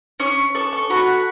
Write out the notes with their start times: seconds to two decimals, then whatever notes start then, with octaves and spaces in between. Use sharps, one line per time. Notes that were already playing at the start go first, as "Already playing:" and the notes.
0.20 C#4 C#6
0.55 A4 C#6
0.73 C#6
0.90 F#4 B5